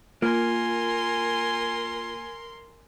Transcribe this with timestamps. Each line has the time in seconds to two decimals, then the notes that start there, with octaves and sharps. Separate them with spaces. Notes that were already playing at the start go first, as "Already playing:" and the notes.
0.22 A#3 F4 A#4 G#5 C6